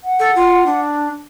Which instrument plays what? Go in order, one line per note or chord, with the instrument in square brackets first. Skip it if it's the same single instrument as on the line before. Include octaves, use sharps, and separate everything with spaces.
[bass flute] F#5
[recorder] A4
F4
D4